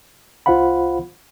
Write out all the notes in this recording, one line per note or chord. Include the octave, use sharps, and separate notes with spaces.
C2 F4 C5 F5 F#5 B5